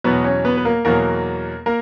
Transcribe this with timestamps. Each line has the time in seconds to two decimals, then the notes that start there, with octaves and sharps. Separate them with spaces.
0.04 E2 B2 F#3 B3 B4
0.24 C#4 C#5
0.45 B3 B4
0.57 B4
0.65 A#3 A#4
0.85 E2 B2 F#3 A#3 A#4
1.66 A#3 A#4